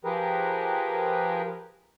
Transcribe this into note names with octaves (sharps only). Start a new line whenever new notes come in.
F3 G4 G#4 A#4 B4